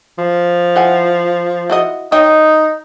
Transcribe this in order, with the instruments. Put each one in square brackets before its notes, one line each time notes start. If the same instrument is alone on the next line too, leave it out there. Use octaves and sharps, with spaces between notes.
[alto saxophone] F3
[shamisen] E4 F#5 G#5
E4 F#4 D#5
[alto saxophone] D#4 [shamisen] C#5 D#5 G5